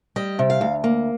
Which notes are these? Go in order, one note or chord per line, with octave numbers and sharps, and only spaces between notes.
G3 D#5
C3
F5
D2
A#3